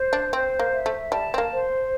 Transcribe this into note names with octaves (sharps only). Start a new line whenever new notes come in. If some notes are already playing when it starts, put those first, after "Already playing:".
Already playing: C5
D4
C4 C5
A#3
E5
A3
G3 A5
C4
A#3
C5